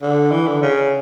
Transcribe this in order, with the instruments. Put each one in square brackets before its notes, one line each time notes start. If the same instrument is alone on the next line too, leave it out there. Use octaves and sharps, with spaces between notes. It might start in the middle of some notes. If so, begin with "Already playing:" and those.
[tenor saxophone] D3
E3
D3
C#3